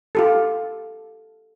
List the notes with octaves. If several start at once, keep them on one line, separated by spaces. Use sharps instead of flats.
F4 G4 A4